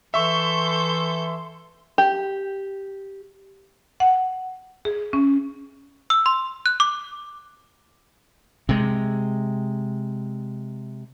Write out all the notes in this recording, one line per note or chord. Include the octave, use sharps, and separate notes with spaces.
E3 A4 E5 C6 C#6 G6
G4
F#5
G#4
C#4
E6
C6
F#6
D6
C3 G#3